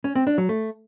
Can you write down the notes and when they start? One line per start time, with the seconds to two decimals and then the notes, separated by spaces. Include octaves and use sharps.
0.04 C#4
0.15 C4
0.27 D4
0.38 F#3
0.49 A3